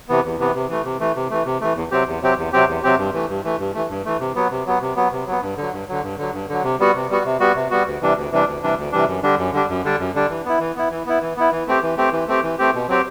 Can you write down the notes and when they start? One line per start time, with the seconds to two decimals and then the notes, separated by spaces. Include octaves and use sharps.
0.09 C3 E3 B3
0.24 E2
0.39 C3 E3 B3
0.55 C3
0.70 E3 A3
0.85 C3
1.00 E3 A3
1.16 C3
1.30 E3 A3
1.46 C3
1.61 E3 A3
1.77 E2
1.91 C3 F#3 C4 G4
2.07 E2
2.22 C3 F#3 C4 G4
2.37 E2
2.53 C3 F#3 C4 G4
2.68 E2
2.83 C3 F#3 C4 G4
2.98 G2
3.14 E3 A3
3.29 G2
3.44 E3 A3
3.59 G2
3.75 E3 A3
3.90 G2
4.05 E3 A3
4.20 C3
4.36 F#3 B3
4.51 C3
4.66 F#3 B3
4.81 C3
4.96 F#3 B3
5.12 C3
5.27 F#3 B3
5.42 G2
5.57 D3 F#3
5.72 G2
5.88 D3 F#3
6.03 G2
6.18 D3 F#3
6.34 G2
6.49 D3 F#3
6.64 C3
6.80 G3 B3 F#4
6.95 C3
7.10 G3 B3 F#4
7.25 C3
7.40 G3 B3 F#4
7.56 C3
7.71 G3 B3 F#4
7.86 D2
8.01 C3 E3 G3 D4
8.17 D2
8.32 C3 E3 G3 D4
8.47 D2
8.62 C3 E3 G3 D4
8.78 D2
8.92 C3 E3 G3 D4
9.08 F#2
9.23 D3 G3 D4
9.38 F#2
9.53 D3 G3 D4
9.69 F#2
9.84 D3 G3 D4
9.99 F#2
10.15 D3 G3 D4
10.30 E3
10.45 B3 E4
10.60 E3
10.76 B3 E4
10.91 E3
11.06 B3 E4
11.21 E3
11.37 B3 E4
11.52 E3
11.67 A3 C4 G4
11.82 E3
11.97 A3 C4 G4
12.12 E3
12.28 A3 C4 G4
12.43 E3
12.58 A3 C4 G4
12.74 B2
12.88 F#3 C4 G4